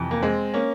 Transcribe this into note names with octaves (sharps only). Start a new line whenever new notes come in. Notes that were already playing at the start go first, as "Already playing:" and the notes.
Already playing: F2 C3 E3
A#3
G#3 C4
A#3 C#4